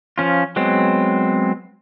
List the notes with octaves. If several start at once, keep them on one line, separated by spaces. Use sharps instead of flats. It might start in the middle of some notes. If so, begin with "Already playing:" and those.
F3 C#4 F4
F#3 G#3 B3 C4